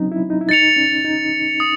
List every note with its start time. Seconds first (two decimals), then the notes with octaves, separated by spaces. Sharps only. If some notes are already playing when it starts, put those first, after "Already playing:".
Already playing: F#3 C4 C#4 D#4
0.12 E4
0.30 D#4
0.41 E4
0.49 D#4 A6 C#7 F7
0.76 C#4
1.05 D#4
1.60 D#6